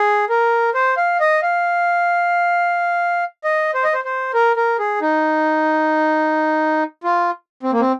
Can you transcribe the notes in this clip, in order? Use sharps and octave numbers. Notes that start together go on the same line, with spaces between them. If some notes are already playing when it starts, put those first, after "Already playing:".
Already playing: G#4
A#4
C5
F5
D#5
F5
D#5
C5
D#5
C5
C5
A#4
A#4
G#4
D#4
F4
C4
A#3
C4